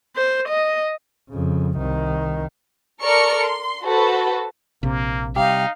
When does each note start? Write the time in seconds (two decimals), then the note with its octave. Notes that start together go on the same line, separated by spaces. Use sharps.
0.16 C5
0.49 D#5
1.30 F2 C#3
1.78 C2 D#3
3.01 A4 A#4 D5 C#6 F6 C#7
3.40 C6
3.83 F#4 A4 B4 C5
4.83 A#1 C3 A#3
5.36 C2 D#4 G4 F5